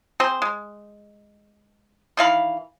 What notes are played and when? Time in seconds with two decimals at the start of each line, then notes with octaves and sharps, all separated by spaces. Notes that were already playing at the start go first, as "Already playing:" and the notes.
0.20 C4 G#4 C5
0.42 G#3
2.17 D#3 E3 F5 B5